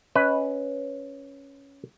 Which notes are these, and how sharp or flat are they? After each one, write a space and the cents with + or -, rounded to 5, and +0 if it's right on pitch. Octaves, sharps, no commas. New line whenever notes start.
C#4 +0 B4 +0 D#5 +30